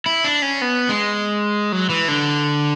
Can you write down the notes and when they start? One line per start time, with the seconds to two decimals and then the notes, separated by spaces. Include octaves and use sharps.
0.06 E4
0.24 D4
0.42 C#4
0.62 B3
0.89 G#3
1.72 F#3
1.90 E3
2.08 D3